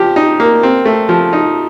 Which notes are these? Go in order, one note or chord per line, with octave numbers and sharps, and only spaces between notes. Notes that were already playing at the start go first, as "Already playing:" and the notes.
Already playing: F3 G4
D#4
A#3
C4
A3
F3
D#4